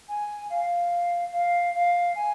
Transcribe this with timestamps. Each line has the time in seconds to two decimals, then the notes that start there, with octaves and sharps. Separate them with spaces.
0.09 G#5
0.50 F5
1.33 F5
1.75 F5
2.15 G#5